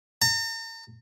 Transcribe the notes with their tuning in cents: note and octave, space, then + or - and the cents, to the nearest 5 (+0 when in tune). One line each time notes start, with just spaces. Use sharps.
A#5 -45